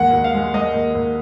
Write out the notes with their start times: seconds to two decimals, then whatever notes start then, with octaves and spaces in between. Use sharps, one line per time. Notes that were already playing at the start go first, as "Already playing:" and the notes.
Already playing: D#2 G#3 F#5
0.13 D#2
0.24 F5
0.34 G#3
0.54 G#3 D#5
0.74 D#2
0.95 D#2